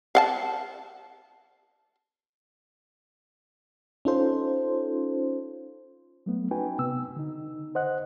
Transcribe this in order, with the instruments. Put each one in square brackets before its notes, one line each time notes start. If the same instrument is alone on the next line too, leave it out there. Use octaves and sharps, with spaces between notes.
[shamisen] F5 F#5 A5
[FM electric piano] C#4 D#4 F4 A4 C5
[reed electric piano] F#3 A3 B3
C#4 D#4 F#4 B4 G5 G#5
C3 B3 E6
D3 D#4
C5 D#5 F#5 F#6